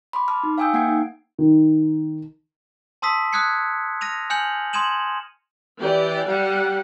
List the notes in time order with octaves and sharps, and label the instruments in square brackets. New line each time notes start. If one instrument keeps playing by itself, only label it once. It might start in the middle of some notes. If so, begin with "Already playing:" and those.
[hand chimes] B5 C6 D6
A5 D6 F6
D#4
F5 G5 G#5 D#6 E6 G6
A#3 F#5 G5 G#6 C7 D7
D#4
[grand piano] D#3
[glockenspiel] A5 C6 D#6 E6 B6 C7
D#6 F6 F#6 G#6 C7 C#7
F6 A#6 D#7 F7
G#5 F6 G6 C#7 F7 F#7
C6 D#6 G#6 D#7 E7 F#7
[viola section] E3 G4 D5
G3 G4 F#5